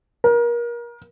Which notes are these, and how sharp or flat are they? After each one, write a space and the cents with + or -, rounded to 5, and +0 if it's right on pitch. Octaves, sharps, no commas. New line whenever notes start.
A#4 +30